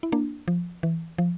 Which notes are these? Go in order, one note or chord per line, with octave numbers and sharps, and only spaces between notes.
E4
A#3 D4
F3
E3
F3